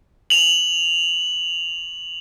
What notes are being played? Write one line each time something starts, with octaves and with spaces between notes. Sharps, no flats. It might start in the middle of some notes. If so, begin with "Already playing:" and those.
F7 F#7